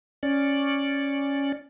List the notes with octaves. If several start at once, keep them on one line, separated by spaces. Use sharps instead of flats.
C#4 D5